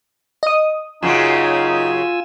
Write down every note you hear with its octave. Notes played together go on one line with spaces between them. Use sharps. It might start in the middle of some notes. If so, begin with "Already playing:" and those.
D#5 D#6
F#2 C#3 F#3 D#4 F4 G#5 E6